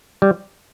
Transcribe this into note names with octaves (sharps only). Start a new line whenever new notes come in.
G3